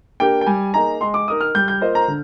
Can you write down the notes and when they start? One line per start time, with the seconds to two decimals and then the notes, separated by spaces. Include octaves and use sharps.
0.20 A#3 D4 G4 A#4 G5
0.41 G5
0.46 G3 G#5
0.73 A#3 D#4 G#4 A#5
1.01 G#3 C6
1.14 D6
1.28 D#4 A#4 D#5 D#6
1.41 F6
1.55 G3 G6
1.68 G6
1.81 A#3 F4 C5 D#5
1.95 A#5
2.08 D3